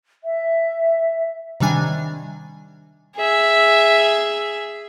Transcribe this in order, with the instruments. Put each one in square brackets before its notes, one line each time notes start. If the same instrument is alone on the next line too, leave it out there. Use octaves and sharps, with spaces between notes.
[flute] E5
[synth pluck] C3 D#3 G3 D4 G#5
[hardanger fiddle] G#4 E5